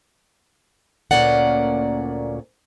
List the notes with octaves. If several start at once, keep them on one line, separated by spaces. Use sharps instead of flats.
D2 A#2 A#3 C#4 D5 F#5